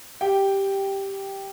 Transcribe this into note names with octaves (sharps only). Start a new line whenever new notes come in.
G4 G5